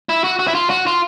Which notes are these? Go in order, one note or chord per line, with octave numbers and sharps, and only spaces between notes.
E4
F#4
F#4
E4
F4
F#4
F4